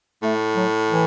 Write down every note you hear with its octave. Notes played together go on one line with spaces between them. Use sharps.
A2 A3
F#3
E3